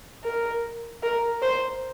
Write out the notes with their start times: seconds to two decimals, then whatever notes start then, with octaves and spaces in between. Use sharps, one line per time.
0.24 A#4
1.03 A#4
1.42 C5